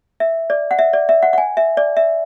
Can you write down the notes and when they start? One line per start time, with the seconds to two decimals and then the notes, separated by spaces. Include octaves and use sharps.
0.20 E5
0.50 D5
0.71 F#5
0.79 E5
0.93 D5
1.09 E5
1.23 F#5
1.33 F#5
1.38 G#5
1.57 E5
1.77 D5
1.97 E5